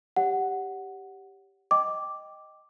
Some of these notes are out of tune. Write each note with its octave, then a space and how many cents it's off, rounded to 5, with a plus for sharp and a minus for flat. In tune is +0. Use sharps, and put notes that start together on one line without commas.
G4 +0 C#5 +30 F#5 +0
D#5 +0 G5 +0 D6 +0